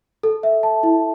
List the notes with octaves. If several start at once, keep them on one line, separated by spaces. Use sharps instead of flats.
A4
E5
A5
E4